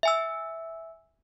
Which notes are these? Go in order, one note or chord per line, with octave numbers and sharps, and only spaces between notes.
E5 G#5 E6